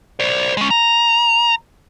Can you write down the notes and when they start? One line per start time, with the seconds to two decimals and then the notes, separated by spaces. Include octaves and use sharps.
0.20 C5 D5
0.57 G#3 C#4
0.70 A#5